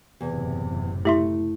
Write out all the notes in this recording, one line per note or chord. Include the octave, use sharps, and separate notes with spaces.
F#1 E2 A2 C3
A3 E4 G4 E5 C6